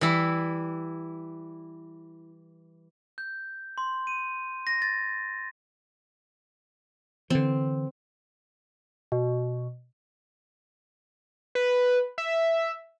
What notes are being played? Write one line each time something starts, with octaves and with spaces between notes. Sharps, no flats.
E3 G3 E4
G6
C6
D#7
A#6
A6
D3 E3 C4
B2
B4
E5